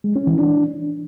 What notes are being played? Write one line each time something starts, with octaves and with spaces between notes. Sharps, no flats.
G#3
C#4
E3
D4